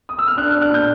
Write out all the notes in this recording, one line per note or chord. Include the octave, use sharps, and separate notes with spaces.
D#6
E6
F6
D4 F#6
D4 F6
F#6
A#2 G6